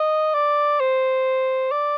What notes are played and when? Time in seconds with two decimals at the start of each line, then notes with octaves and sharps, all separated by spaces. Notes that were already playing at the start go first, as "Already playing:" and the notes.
Already playing: D#5
0.34 D5
0.80 C5
1.71 D5